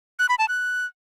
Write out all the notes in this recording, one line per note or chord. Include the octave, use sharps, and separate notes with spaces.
F#6
B5
A5
F#6